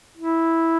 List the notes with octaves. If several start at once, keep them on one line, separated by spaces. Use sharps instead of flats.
E4